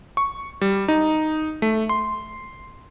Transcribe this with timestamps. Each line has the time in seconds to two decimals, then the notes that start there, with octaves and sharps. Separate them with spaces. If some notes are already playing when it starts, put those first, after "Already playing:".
0.17 C#6
0.61 G3
0.88 D#4
1.62 A3
1.89 C6